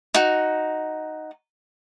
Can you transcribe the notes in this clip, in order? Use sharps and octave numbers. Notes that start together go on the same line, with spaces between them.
D#4 F#4